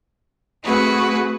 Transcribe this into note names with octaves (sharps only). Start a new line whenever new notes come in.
A3 C4 F#4 G#4 B4 F#5